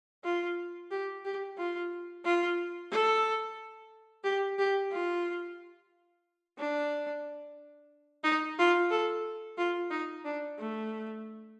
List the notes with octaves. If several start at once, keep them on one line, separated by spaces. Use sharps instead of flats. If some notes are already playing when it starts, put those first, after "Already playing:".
F4
G4
G4
F4
F4
A4
G4
G4
F4
D4
D#4
F4
A4
F4
D#4
D4
A3